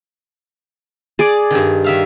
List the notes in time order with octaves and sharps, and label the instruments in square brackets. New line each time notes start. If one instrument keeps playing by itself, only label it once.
[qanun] G#4 D5
[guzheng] G2 D#3
D#3 E5 F5